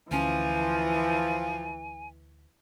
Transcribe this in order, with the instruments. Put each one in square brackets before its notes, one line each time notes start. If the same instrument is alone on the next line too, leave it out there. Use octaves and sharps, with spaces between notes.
[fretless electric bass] D2 C#4 [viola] E3 [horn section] F3 [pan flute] G#5